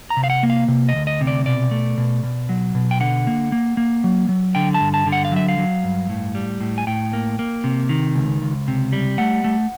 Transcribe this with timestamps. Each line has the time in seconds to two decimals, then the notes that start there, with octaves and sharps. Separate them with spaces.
0.10 A#5
0.17 C3
0.24 F5
0.30 F#5
0.43 A#3
0.50 F5
0.68 C3
0.89 D#5
0.95 D2
1.07 D#5
1.21 C3
1.27 D5
1.46 B2 D5
1.71 A3
1.98 B2
2.23 B2
2.49 F#3
2.75 B2
2.91 G5
3.00 D3 F#5
3.27 A#3
3.52 A#3
3.77 A#3
4.04 F#3
4.29 F#3
4.55 D3 G5
4.74 A5
4.81 G2
4.94 A5
5.07 D3
5.12 F#5
5.25 F5
5.32 F#3 E5
5.48 F5
5.58 F#3
5.84 G2
6.10 A2
6.35 G3
6.61 A2
6.78 G#5
6.87 A2 G5
7.13 A#3
7.39 A#3
7.64 C3
7.89 D#3
8.15 C#2
8.42 C#2
8.68 C3
8.92 G3
9.18 A3 F#5
9.44 A3